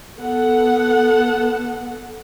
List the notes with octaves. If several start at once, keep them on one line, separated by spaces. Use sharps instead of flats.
B3 A4 F#5